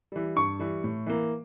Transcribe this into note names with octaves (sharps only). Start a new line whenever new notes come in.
E3 G3
G2 C#6
E3 G3
A2
E3 A#3